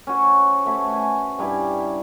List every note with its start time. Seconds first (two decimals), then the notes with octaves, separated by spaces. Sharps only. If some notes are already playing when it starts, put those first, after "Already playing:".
0.07 C#4 F#4 C5
0.65 A3 F#4 B4 C#5
0.93 G#5
1.38 G2 G3 E4 G#5